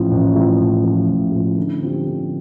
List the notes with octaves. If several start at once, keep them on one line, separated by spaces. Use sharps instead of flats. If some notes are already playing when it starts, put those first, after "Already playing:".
Already playing: A1 A2 F3
A1
A2
F3
A1
A2 F3
A1
A2 F3
D3
F3 C4 G4
D3